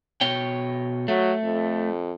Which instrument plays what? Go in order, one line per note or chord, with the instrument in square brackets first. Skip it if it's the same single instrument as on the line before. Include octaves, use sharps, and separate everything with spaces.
[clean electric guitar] B2 C#5 G5
[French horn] F#3 [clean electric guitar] A3
[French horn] F2